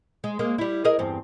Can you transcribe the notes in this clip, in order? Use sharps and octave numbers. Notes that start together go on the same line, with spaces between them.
G#3
G#3 A#3
G3 E4
G#4 A#4 D#5
E2 G2 C4